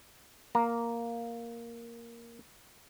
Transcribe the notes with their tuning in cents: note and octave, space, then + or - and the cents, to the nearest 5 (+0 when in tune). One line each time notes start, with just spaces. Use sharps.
A#3 +0 A#5 +0